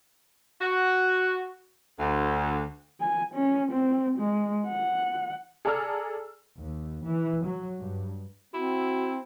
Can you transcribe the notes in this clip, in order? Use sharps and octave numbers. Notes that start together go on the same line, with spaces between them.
F#4
D2
G#5
C#4
C4
G#3
F#5
G#4 A4 D5 A#5 E6 F6
D#2
E3
F#3
G2
C4 E4 F#4